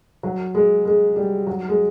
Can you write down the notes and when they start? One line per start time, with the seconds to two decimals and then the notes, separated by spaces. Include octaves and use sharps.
0.23 F#3
0.55 G#3
0.85 G#3
1.16 G3
1.47 F#3
1.69 G#3